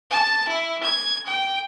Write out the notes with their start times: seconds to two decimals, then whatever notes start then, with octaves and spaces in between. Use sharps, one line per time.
0.10 A5
0.48 E4
0.83 G#6
1.26 G5